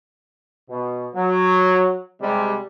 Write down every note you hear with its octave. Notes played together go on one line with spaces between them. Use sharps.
B2
F#3
C3 G3 G#3